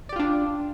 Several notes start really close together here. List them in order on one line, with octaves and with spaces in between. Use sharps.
D5 G4 F4 D4